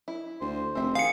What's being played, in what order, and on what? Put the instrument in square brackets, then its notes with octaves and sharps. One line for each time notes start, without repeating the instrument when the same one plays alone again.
[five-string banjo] E4
[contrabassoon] D2 [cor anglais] C5
[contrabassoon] F1 [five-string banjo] C4 E5
[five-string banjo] D#3 [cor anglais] G#4 [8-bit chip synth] F5 C#7